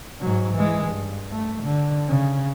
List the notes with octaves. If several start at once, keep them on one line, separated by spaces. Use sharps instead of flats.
G#2 F#3
E3 G#3
G2
A3
D3
C#3